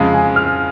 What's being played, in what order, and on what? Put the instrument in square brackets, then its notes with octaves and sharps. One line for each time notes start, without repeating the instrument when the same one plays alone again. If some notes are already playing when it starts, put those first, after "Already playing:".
Already playing: [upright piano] F2 C#3 G#3 [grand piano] F5
[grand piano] G#5
F6